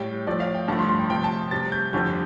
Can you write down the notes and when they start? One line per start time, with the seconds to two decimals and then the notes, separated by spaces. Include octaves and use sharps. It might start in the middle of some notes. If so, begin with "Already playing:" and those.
Already playing: A2 G3 G5
0.26 A2 F3 A3 D5
0.40 F5
0.55 G5
0.68 G2 D3 F3 A3 A5
0.79 C6
0.89 C6
0.99 G5
1.10 C3 F3 A3 G5
1.24 A5
1.51 C3 G3 A6
1.72 G6
1.93 F2 D3 G3 G6